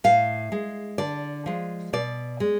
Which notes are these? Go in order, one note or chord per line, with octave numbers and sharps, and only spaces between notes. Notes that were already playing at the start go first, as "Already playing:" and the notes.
A2 F5
G#3
D3 D5
F3 G#3
B2 D5
G#3